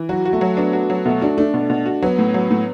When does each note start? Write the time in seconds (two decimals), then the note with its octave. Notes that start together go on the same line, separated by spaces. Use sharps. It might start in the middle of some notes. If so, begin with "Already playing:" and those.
Already playing: E3
0.09 F#3 F#4
0.25 F#4
0.33 A3
0.41 F#3
0.57 B3 D4
0.73 F#4
0.90 F#3
1.06 B2 A3
1.21 D4 F#4
1.38 A3 D4
1.54 B2
1.70 B2
1.86 F#4
2.02 F#3 B3
2.18 A2
2.34 F#3
2.51 A2